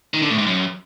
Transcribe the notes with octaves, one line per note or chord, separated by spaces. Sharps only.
D#3
D3
A2
G#2
F#2